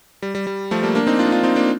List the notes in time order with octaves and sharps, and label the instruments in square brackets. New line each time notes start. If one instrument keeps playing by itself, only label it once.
[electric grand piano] G3
G3
G3
F3 A3
G3 A#3
A#3 D4
C4 D#4
D4 F4
D#4
D4 F4
C4 D#4
A#3 D4